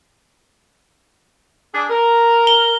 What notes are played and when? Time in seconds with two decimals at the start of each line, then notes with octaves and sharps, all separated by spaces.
1.73 D4 G#4
1.89 A#4
2.47 G7